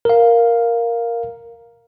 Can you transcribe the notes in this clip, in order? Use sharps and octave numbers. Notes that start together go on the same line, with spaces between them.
A#4 F5